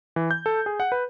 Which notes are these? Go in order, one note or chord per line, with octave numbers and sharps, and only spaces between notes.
E3
G6
A4
G#4
F#5
B4